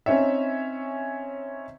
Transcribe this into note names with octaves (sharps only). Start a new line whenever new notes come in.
C4 C#4 D#4 C#5 E5